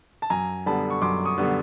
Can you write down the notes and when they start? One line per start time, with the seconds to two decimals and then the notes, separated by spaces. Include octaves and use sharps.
0.22 A5
0.30 F#2 G#5 A#5
0.66 D3 G3 B3 A5 B5
0.90 C#6
1.02 F#2 C6 D6
1.25 C#6 D#6
1.38 D3 G3 B3